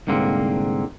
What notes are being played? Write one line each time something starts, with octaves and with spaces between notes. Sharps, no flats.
C2 G#2 D3 A#3 C4